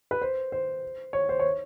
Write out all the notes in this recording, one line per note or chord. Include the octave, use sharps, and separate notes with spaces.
B4
C5
C5
C#5
C5
C#5